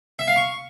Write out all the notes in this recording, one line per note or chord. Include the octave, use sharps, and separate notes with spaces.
E5
F5
C#6